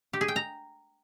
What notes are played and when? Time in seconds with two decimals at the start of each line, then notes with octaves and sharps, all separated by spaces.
0.13 G4
0.21 G#4
0.28 G5
0.36 A#5